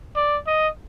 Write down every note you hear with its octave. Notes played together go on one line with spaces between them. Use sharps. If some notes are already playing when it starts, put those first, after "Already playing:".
D5
D#5